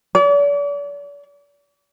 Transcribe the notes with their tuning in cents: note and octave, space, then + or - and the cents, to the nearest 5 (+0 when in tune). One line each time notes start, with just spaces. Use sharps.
D5 -40